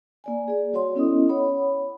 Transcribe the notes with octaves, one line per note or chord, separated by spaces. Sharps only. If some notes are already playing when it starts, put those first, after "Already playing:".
A#3 D5 G#5
G#4 D5
G3 F#4 C#5 F#5 C6
B3 C#4 E4 A4 D#5 D#6
C#5 F#5 B5